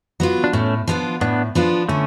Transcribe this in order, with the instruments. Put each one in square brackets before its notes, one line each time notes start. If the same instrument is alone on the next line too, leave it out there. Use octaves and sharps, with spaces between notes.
[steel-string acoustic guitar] F#3 B3 F4
[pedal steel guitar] D4
[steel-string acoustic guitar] A2 [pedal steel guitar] A3 C#4
[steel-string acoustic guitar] F3 B3 D4 F4
[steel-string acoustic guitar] A2 [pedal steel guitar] B3 D4
[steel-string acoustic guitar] F3 B3 D4 F4
[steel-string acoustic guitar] D3 [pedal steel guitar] A3 C#4